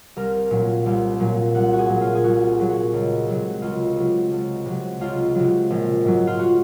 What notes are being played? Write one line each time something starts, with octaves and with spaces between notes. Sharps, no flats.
C2 A#4
A#2 F#3
C2
A#2 F#3
C2 F#5
F#4
G#4
A#2 F#3
F4
G#4
C2 F#4
A#2 F#3
F#4
C#2
C3 F#3
C#2 F4
C3 F#3
C#2
C3 F#3
C#2 F4
C3 F#3
A#1
G#2 F#3
F4
F#4